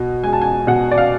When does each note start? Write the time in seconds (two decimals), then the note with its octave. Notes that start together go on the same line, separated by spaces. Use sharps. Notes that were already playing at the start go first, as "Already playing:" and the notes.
Already playing: B2
0.23 G#3 G#5
0.33 A5
0.42 G#5
0.67 B2 F#5
0.91 D5
0.98 F5